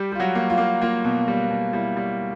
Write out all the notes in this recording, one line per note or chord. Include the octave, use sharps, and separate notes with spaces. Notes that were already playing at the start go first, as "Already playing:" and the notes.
Already playing: G3 G4
G3 F4
F#3 F#4
A#3
F4
A#3
A#3 F4
B2
G3
B2
G3 E4
G3